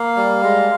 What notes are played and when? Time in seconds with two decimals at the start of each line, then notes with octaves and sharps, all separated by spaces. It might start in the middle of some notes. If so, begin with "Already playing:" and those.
Already playing: A#3 F5
0.16 G3
0.43 G#3